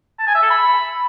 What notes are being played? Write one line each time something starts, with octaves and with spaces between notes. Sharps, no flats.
A5
G#5
E5
A4
B5